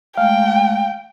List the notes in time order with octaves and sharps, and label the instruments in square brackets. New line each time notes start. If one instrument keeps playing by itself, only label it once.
[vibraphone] G#3 A3 [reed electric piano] F5 [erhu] G5